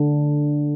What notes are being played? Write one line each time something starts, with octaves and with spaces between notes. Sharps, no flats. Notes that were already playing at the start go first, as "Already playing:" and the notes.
Already playing: D3